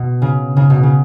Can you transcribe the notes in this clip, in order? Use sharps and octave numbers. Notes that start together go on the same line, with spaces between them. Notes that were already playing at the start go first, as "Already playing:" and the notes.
Already playing: B2
C#3
C#3
B2
C#3